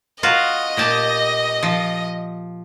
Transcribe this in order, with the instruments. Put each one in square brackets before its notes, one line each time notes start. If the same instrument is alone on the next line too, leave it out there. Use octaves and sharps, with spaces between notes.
[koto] F4 F#4 F5 [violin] D#5
[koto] A#2 G4 A5
F3